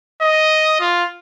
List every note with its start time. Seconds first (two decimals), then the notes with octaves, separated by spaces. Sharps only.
0.22 D#5
0.80 F4